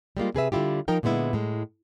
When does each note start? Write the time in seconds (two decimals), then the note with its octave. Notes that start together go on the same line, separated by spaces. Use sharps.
0.17 G3 G#3 A#3 F4
0.35 C3 G#4 B4 E5
0.52 D3 G3 E4 F4 G4
0.88 F3 D#4 A#4 G5
1.03 A#2 D3 G#3 B3 E4
1.33 A2 G#3